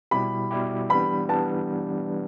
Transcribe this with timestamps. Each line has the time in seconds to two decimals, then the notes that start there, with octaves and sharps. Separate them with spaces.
0.11 B2 G3 E4 G4 B5
0.51 B2 G3 E4 G4
0.90 E3 G3 B3 D4 B5
1.29 E3 G3 B3 D4 A5